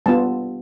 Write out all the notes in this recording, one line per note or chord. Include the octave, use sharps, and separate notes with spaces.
G3 B3 F4 A5